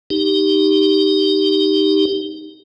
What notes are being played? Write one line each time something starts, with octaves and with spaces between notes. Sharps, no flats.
D#4 G4